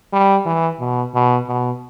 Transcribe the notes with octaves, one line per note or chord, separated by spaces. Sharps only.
G3
E3
B2
B2
B2